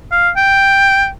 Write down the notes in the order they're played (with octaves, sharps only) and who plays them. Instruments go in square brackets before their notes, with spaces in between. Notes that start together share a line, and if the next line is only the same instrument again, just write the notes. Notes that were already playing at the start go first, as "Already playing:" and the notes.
[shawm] F5
G5